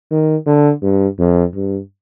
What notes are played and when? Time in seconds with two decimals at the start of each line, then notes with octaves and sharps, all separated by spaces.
0.11 D#3
0.46 D3
0.82 G2
1.19 F2
1.54 G2